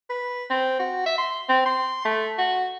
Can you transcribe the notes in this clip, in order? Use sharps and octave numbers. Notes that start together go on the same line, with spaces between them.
B4
C4
F#4
E5
C6
C4
C6
A3
F#4